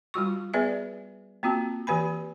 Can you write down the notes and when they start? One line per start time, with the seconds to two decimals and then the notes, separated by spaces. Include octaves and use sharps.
0.14 G3 F4 F#4 C#6
0.54 B3 G#4 B4 D5 E5
1.43 A#3 C4 F4 F#4 A5
1.87 E3 G4 B4 G#5 B5